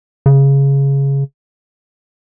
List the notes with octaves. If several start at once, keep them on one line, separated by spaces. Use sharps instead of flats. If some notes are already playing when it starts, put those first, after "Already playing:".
C#3